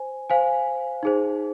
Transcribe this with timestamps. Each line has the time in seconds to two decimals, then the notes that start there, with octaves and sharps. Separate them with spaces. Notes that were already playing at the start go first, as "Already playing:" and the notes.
Already playing: C5 G#5
0.30 C5 F5 G#5
1.03 D#4 G#4 C5